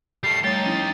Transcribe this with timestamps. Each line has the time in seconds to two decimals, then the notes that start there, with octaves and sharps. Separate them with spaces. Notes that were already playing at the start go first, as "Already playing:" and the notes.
0.23 G3 A3 C7
0.44 G3 A3 D#4 G4 C#5 A6
0.63 F3 C#4 E4